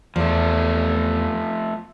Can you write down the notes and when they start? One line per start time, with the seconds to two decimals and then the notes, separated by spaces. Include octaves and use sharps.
0.16 E2 F3 A3